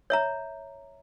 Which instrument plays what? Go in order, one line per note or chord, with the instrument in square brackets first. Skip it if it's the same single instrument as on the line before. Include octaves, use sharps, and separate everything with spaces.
[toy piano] C#5 E5 A#5